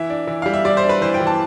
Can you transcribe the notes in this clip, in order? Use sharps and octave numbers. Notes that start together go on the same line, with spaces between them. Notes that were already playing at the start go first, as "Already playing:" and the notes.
Already playing: E3 E5
D4
E3
G3 F5
E5
G3 D5
C5
D4
B4
E3 C5
G5
E3
A5